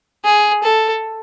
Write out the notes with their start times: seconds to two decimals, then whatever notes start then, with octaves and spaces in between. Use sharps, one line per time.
0.25 G#4
0.63 A4